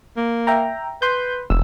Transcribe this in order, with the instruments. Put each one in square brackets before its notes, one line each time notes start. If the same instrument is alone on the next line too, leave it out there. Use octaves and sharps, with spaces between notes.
[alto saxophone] A#3
[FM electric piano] E5 G5 A#5
[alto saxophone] B4 [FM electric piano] C6 G6
[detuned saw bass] E1 [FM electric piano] E6